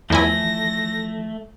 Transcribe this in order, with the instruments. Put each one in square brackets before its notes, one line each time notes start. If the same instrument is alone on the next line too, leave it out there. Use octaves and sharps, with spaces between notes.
[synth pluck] E2 E4 G#5 [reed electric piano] E3 F3 [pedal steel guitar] A3 [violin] A#6